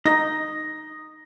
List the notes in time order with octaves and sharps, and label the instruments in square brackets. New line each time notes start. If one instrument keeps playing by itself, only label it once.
[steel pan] D#4 [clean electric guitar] D#5 [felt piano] A#6